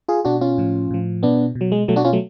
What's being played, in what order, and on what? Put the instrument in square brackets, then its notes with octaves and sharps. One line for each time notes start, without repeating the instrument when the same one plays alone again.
[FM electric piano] F4 G#4
B2 D4 F#4
C#4 F4
A2 F3
A2 F3
B2 B3 D4
B2
F#3
G#3
B2 F#3 A3
D4 F#4
C#4 F4
F#3 A3